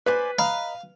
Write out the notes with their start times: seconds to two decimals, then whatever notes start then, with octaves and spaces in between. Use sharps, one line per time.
0.06 B4 C5 D5 G#5
0.39 D#5 F5 A#5 B5